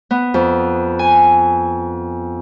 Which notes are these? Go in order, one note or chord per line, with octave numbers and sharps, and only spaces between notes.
B3
F2
G#5